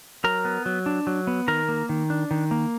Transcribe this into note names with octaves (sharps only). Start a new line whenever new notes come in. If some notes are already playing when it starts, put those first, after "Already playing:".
F#3 A#4 A#5
B3
F#3
D4
F#3
B3
D#3 A#4 A#5
A#3
D#3
D4
D#3
A#3